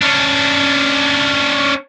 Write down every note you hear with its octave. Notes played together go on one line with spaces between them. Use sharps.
C#4 D4